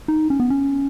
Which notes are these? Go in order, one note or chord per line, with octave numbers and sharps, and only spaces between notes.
D#4
C#4
B3
C#4